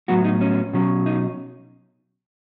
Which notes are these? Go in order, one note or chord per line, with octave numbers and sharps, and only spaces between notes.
A2 F#3 B3 F#4
D#4
C#4
B2 F#3 C#4
D#4